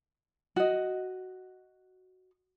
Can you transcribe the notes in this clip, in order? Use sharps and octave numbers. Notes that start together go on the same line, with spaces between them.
F#4 D#5